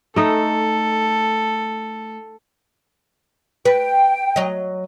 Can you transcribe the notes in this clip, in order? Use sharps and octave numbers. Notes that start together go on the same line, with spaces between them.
A3 D#4 A4
B4 G5
F#3 D#5